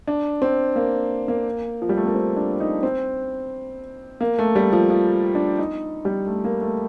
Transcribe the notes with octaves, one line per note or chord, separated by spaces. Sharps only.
D4
C4
A#3
A#3
F3
G3
A3
A#3
C4
D4
D#4
C4
A#3
A3
G3
F3
F3
D4
D#4
G3
A3
A#3
A3